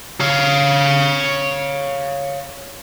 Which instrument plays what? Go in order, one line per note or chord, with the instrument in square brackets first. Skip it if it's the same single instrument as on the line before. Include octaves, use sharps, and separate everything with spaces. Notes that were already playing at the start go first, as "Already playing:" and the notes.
[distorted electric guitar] C#5 F5